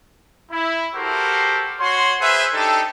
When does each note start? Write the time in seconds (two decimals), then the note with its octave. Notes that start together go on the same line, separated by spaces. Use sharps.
0.50 E4
0.94 F#4 G4 A4 A#4 C5
1.79 F#4 C#5 C6
2.20 G#4 B4 C5 E5
2.52 D4 D#4 G4 A4